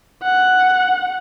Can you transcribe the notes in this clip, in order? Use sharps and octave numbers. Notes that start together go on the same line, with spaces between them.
F#5